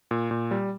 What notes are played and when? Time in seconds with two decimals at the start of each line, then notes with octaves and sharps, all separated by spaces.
0.11 A#2
0.31 A#2
0.51 G3